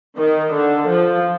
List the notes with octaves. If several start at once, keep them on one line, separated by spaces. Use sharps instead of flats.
D#3
D3
F3